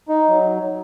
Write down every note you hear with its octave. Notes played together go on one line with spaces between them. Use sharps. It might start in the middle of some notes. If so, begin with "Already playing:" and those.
D#4
F#3